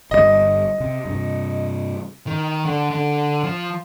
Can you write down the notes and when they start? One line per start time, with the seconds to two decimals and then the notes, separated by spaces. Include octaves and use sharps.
0.11 G1 B2 G3 D#5
0.80 C3
1.05 G2 C3
2.27 D#3
2.65 D3
2.91 D3
3.43 F3